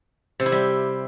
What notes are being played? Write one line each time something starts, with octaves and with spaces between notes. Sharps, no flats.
C3
E4
G3